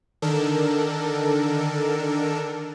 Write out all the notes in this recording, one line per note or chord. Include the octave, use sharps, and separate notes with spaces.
D3 D#3 D4 A4 A#4